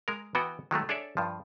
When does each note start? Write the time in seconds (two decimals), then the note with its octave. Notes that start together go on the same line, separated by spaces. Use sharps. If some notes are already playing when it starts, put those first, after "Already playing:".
0.08 G#3 A#4
0.35 E3 B3 E4 F#4 G5
0.71 D#3 F#3 G#3 A3
0.89 D4 G#4 A4 C#5 D5 E5
1.17 G2 F3